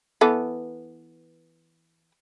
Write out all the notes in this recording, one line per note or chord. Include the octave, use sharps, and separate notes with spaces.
E3 B3 A4